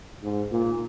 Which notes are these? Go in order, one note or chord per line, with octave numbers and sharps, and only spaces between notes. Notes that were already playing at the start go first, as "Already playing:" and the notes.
G#2
A#2